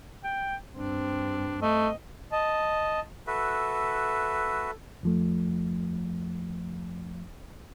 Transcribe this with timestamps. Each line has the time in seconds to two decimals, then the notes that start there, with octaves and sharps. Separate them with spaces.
0.24 G5
0.75 G2 C4 D4
1.62 A3 D#5
2.32 D#5 A5
3.27 F#4 A4 B4 E5
5.03 F2 F3 A3